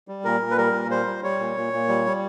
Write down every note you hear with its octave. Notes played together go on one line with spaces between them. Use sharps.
G3
A#2 A#4
A#2
B4
G3 A#4
A#2
G3 C5
G3
G3 C#5
A#2
A#2
A#2
G3
G3